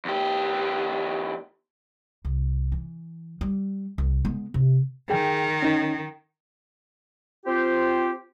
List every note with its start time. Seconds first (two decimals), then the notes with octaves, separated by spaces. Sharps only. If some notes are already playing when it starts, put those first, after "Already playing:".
0.05 E2 G4
2.25 C2
2.72 E3
3.41 G3
3.98 C2
4.25 G#3 B3
4.54 C3
5.10 D#3 G#4 G5
5.62 C#4 D#4
7.46 C4 F4 G4 C5